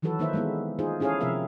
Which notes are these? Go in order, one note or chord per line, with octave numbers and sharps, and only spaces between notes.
D#3 E3 F#3 F#4 A4 B4
D#3 A#3 D#4 B4 C5 E5
G#3 A3 B3 D#4 E4
D#4 F4 G#4 C5
C#4 E4 G#4 A4 C#5 F5
C3 F3 C4 A#4 E5 F5